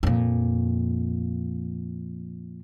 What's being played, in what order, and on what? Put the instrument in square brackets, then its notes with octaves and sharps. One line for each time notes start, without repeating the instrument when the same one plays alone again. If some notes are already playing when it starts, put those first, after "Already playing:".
[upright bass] F2 A#2